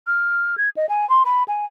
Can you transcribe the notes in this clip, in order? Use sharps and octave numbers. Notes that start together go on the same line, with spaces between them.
F6
G#6
D#5
G#5
C6
B5
G#5